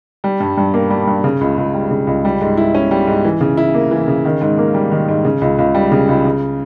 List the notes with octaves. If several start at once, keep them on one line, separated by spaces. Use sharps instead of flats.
G3
G2
G2
A#3
G3
G2
C#3
C#2
C#2
G3
C#3
C#2
G3
G#2
E4
C#4
G3
G#2
E3
C#3
E4
A#3
E3
C#3
D#3
G#2
A#3
G3
D#3
G#2
C#3
C#2
C#2
G3
C#3
C#2
C#3